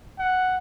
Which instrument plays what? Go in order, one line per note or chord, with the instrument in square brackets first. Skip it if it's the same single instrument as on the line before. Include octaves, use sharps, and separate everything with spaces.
[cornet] F#5